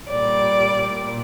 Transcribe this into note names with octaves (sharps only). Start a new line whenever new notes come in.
A#2 G3 D5
A#2